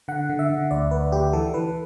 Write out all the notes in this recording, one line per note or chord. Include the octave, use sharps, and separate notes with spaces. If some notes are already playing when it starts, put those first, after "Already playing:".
D3 F#5
D3
E5
D3
D2 D5
D2 B4
D2 G4
E3 A4
E3 B4